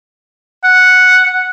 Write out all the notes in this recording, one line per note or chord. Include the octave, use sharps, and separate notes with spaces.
F#5